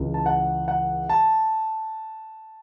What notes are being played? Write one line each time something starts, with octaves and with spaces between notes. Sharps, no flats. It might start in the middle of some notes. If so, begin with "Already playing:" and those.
Already playing: C#2 C#3 E3
A5
F#5
F#5
A5